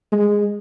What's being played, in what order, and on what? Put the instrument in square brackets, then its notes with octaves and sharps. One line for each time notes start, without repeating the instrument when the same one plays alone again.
[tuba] G#3